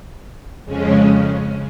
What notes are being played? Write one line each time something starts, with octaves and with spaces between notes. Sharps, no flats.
F2 C#3 G#3 C#4